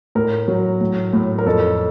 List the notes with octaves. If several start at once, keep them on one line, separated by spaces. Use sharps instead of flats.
A2 A#4
F#3
A2
A2
A#4
F2 A4